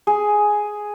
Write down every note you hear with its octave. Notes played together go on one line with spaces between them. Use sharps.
G#4